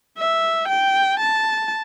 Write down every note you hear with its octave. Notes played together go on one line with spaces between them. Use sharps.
E5
G5
A5